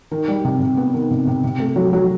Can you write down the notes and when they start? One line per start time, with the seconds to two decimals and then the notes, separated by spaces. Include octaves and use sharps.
0.11 D#3
0.28 G3
0.45 C3
0.60 C3
0.77 B3
0.94 D#3
1.11 C3
1.27 C3
1.44 C3
1.60 A3
1.76 F#3
1.93 F#3